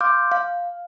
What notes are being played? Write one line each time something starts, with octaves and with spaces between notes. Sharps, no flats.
F5 C6 D6 F6 G6
F5